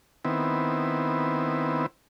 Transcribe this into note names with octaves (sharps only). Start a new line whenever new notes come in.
D#3 B3 C4 E4